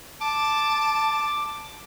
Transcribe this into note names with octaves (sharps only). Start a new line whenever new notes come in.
A5 D6